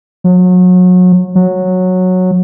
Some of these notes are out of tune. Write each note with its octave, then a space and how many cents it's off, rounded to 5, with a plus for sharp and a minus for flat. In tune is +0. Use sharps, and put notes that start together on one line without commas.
F#3 -30
F#3 -10